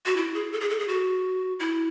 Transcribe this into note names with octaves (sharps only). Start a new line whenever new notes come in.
F#4
E4
G#4
A4
G#4
A4
G#4
F#4
E4